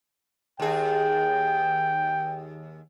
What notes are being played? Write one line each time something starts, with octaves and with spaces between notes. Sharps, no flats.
D#2 G#4 G5